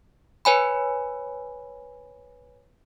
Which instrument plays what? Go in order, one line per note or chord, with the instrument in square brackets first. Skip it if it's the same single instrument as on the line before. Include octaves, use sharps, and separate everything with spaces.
[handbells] B4 C#5 G#5 B5